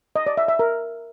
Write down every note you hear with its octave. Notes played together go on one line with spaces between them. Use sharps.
D#5
D5
E5
E5
A#4